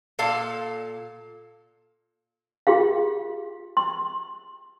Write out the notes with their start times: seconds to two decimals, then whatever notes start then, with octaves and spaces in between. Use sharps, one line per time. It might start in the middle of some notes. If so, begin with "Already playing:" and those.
0.19 A#2 A4 F5 A5
2.67 F4 G4 G#4 F5
3.77 C6